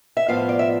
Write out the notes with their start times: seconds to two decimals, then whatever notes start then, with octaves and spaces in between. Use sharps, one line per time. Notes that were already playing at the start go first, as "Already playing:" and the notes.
0.17 E5
0.28 A2 F3 B3 F4 F5
0.49 D5
0.59 E5